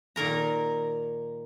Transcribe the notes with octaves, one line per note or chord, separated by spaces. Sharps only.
A#2 D#3 A#4 A#5